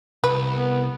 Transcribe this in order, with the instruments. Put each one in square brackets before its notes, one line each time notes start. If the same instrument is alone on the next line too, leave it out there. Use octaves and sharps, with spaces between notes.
[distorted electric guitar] C2 [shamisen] B4
[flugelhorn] B3